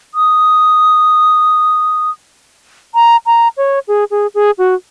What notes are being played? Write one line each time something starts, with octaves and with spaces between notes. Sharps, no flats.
D#6
A#5
A#5
C#5
G#4
G#4
G#4
F#4